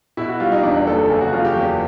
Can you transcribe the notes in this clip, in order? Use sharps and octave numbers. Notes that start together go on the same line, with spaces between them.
B2 E4
F#4
G3 F4
D#4
E2 D4
D#4
F#1 A4
A4
C#3 G#4
F#4
F#1 F4
G4
E2